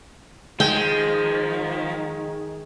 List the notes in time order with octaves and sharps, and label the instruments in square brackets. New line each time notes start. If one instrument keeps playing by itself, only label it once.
[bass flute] D#3 [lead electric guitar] F3 [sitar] G#3 [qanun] G5